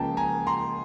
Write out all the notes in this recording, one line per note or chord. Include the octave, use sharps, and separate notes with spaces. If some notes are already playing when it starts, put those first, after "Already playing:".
Already playing: C#2 C#3 F3 A#3 G5 A5 A#5
G#5 A#5
A#5 C6